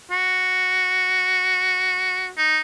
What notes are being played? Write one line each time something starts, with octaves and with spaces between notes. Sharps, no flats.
F#4
D#4